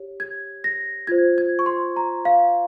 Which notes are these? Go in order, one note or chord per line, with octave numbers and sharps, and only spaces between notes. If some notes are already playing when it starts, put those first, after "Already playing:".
Already playing: G4 C#5
G#6
A#6
F4 C5 G#6
G#6
C#6
C6
A#5
F5